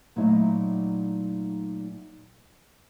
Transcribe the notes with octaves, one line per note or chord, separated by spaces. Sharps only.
A#2 F#3 A3 D#4 E4 D#5